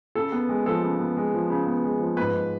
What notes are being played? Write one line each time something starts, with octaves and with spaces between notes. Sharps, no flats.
C#3 A4
B3
G#3
F3 A4
C#3
B3
G#3
F3
C#3
B3
G#3
F3
G#2 B4
G#2